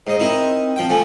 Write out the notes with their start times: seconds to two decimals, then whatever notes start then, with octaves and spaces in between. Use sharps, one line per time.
0.07 G#2 C5 D#5
0.20 C4 D#4 E4 A#4
0.76 F3 G5
0.89 F3 A3 G#5